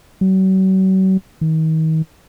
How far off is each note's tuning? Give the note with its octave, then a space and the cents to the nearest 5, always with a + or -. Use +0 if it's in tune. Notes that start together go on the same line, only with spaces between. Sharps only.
F#3 +40
D#3 +35